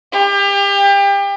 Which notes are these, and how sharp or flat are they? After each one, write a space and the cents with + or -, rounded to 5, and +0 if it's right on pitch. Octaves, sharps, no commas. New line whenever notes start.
G4 +30